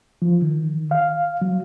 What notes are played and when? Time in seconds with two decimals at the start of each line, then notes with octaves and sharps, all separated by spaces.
0.22 F3
0.42 D#3
0.91 F5
1.42 F#3